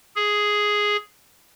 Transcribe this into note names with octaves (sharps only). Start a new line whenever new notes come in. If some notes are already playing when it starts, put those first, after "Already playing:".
G#4